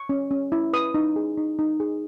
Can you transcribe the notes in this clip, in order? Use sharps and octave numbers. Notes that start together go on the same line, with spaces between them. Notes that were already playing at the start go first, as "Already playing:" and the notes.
Already playing: C#6
C#4
C#4
E4
B4 D#6
D#4
G#4
D#4
D#4
G#4